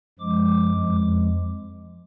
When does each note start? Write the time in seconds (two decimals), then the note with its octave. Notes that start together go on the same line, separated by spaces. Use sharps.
0.19 F#2 F3 G#3 D6
0.74 F2 F3 G#3